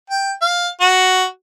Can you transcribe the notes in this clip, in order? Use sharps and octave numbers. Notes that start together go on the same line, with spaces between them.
G5
F5
F#4